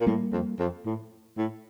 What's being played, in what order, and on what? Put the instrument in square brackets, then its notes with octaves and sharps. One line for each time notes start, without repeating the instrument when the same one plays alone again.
[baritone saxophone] A#2
[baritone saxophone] A2 [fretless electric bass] G3 A#3
[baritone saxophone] F2
F2
A2
A2